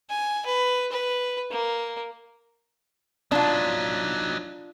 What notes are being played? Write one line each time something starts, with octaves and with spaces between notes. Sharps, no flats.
G#5
B4
B4
A#3
F#3 D4 D#4 F4